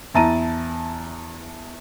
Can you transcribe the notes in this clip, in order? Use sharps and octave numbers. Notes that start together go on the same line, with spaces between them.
E2 E4 A5 A#5 D#7